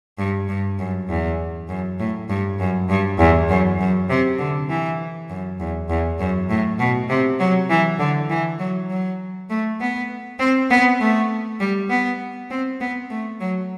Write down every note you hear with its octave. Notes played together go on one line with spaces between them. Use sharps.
G2
G2
F#2
E2
F#2
A2
G2
F#2
G2
E2
F#2
F#2
C3
D3
E3
F#2
E2
E2
F#2
A2
B2
C3
F#3
E3
D3
E3
F#3
F#3
A3
B3
C4
B3
A3
G3
B3
C4
B3
A3
F#3